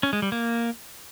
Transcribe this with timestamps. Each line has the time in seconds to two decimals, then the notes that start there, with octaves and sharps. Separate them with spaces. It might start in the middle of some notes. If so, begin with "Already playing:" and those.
0.03 C#4
0.13 G#3
0.22 G3
0.32 A#3